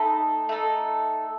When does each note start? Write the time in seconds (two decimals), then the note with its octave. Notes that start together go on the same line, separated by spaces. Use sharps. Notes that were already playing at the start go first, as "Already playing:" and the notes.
Already playing: A3 D#4 A4 B5
0.49 A3 D#4 A4